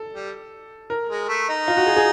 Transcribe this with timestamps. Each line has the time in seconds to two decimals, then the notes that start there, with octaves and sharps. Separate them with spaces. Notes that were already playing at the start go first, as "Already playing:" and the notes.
Already playing: A4
0.13 G3
0.90 A#4
1.09 G#3
1.29 A3
1.49 D#4
1.68 F4
1.77 F#4
1.86 G#4
1.97 G#4